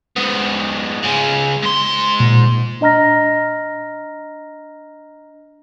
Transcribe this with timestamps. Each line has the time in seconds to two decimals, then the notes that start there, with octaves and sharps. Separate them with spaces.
0.16 G#2 B3
1.03 C#3 G#3
1.63 G#2 C6
2.20 A#2
2.81 D4 D#5 A#5 F6 A#6